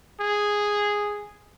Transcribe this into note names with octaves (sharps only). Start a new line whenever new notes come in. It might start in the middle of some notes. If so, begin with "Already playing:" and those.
G#4